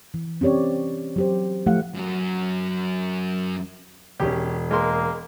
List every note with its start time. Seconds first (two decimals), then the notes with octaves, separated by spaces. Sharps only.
0.14 E3
0.41 C4 C#4 G4 C#5 D5
1.16 F#3 G4 C5
1.66 F3 A3 E4 G4 F5 F#5
1.95 F#2 F#3
4.20 E1 C#4 G4
4.71 G#3 A#3 C6